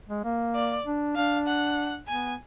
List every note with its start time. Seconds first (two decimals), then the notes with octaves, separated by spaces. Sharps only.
0.09 G#3
0.24 A#3
0.55 D5
0.86 D4
1.16 D4 F5
1.46 F#5
2.08 B3 G#5